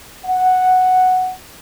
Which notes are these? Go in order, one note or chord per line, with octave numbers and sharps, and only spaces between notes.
F#5